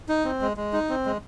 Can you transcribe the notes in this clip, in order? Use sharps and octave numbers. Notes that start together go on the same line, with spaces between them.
D#4
C4
G#3
G#3
D#4
C4
G#3